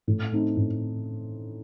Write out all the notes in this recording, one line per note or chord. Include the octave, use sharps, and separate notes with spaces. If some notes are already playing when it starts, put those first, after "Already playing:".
A2
A3 C4 D#4
A2